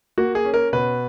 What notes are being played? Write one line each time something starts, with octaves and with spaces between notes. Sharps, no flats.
A#3 F#4
G#4
C#4
A#4
B2 B4